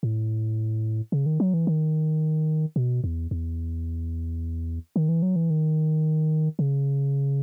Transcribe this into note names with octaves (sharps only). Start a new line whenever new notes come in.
A2
C#3
D#3
F#3
E3
D#3
B2
E2
E2
D#3
E3
F#3
E3
D#3
C#3